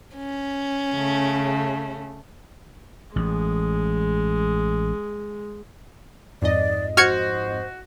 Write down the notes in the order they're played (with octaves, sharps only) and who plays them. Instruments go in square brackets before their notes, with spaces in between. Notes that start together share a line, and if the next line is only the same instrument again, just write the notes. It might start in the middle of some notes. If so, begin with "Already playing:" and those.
[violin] C#4
[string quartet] C#3 A3
[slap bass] A1 [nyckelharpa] G#3
[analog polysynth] F2 G#2 D#5 [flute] D5
[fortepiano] F#4 [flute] C5 [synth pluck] F6 G#6 C#7